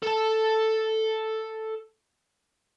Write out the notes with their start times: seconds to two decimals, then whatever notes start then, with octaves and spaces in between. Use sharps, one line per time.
0.03 A4 A5